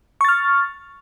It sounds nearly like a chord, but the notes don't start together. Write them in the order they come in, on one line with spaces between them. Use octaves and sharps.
C#6 A6 F6